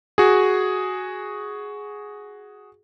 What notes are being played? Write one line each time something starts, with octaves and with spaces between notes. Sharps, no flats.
F#4 G#4